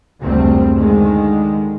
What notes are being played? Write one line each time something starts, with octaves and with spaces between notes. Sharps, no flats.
F#1 D2 C3 G3 A3 C4
D3 D#3 G#3